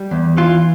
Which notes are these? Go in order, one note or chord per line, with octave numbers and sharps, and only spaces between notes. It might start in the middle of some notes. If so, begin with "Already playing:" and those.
Already playing: G3
E2
E3 F4